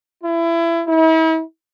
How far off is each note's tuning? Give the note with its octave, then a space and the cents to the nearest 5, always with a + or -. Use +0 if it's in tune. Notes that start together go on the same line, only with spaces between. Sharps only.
E4 +25
E4 -40